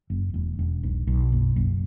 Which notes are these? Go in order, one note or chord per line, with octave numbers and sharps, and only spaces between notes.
F#1
E1
E1
B1
B1
F#1
F#1